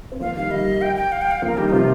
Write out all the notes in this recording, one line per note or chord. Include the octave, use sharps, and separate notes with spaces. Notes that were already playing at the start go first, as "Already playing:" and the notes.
C4
F3 A#3 F5
D#3 G3 F5
D#3 G3 D#5
G5
G5
F5
G5
F5
F3 A#3
A#4
D#3 G3 G4
D#4
C3 F3 F4